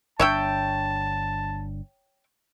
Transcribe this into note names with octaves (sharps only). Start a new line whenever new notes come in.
G1 D4 C#5 E5 G5 A5